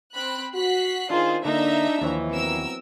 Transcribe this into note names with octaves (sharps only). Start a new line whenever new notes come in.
C4 B5 F#6
F#4 F#6 B6 C7
D#3 D4 D#4 F4 G#4 A#4 C5
D3 A#3 D4 D#4 E5 A#5
D#2 E3 F3 C#5
F#3 B3 C4 A#4 E6